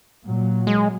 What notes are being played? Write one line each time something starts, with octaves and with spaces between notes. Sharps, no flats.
A#2 F#3
G#3